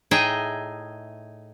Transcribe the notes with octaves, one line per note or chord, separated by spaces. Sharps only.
A2 D#4 G#4 D#5 E5 G5